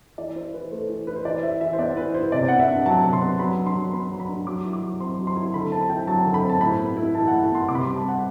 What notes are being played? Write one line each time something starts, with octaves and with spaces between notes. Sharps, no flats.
E3 D5
E4 C5
E3 B4
A3 C5
E3
E4 B4
C5
E3 D5
E4 E5
E3 E5
C5
B3 D5
E3 B4
E4 C5
C3 D5
B3 F#5
E5
D4
F#3 A5
C3
C6
B3
F#3 B5
D4
C6
F#3
B3 B5
F#3
B5
D4
F#3 D6
E4
D6
F#3
C4 C6
F#3
C6
E4
D3 B5
C4 A5
E4 G5
F#3 A5
D3
B5
C4
A5
A2 B5
B3
E4
E3 A5
F#5
A2
A5
B3 C6
C3 D6
B5
C6
G3
A5
C4 F#5